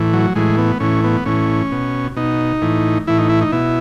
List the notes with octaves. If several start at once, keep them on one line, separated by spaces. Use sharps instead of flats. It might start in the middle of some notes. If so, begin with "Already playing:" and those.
Already playing: A2 E3
F#3
A2 E3 G#3
B3
A2 E3 C#4
B3
A2 E3 C#4
B2
B2 D#4
A2 E3
A2 E3 E4
D#4
E4
D#4
B2 E4